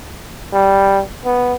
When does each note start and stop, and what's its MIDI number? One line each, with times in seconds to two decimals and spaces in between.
0.53 1.01 55
1.25 1.54 59